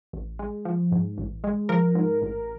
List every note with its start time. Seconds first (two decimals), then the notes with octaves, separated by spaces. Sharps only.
0.13 A1
0.39 G#3
0.65 F3
0.92 G#2
1.18 A1
1.44 G#3
1.69 F3 A#4
1.95 G#2
2.22 A1